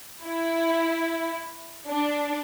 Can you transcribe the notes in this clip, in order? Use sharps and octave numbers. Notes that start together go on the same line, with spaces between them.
E4
D4